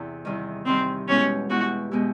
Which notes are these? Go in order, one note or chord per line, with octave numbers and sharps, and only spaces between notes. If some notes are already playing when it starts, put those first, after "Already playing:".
Already playing: E2 C3
E2 C3 D#3 G3
E2 C3 D#3 G3 C4
B2 G#3 B3 C#4 E4 G4
B2 G#3 B3 E4 F#4 G4
B2 G#3 B3 E4 G4